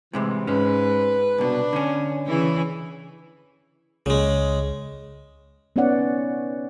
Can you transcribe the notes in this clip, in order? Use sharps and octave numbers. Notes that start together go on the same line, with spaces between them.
A2 C3 E3 G#3
G#2 G#3 C#4 B4
C2 B2 D4
D3 C#4
C#3 E3 E4
C#2 C#3 G#3
B3 C#4 D#4 C#5 D5 F#5